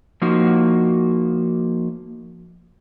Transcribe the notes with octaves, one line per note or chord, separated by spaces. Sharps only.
F3 A#3 D#4 F#4